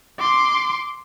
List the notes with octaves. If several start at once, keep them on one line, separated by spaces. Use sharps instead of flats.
C6 D6